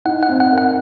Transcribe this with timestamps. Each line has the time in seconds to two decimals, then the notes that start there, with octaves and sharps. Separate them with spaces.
0.05 D#4 F#5
0.23 F#5
0.29 C4
0.40 F#5
0.52 A#4
0.58 F#5